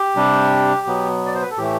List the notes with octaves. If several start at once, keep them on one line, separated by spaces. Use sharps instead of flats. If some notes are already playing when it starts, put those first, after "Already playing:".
Already playing: G4
C3 G3 D4
B2 F#3 B3
D5
C5
B4
A4
A2 E3 A3 G4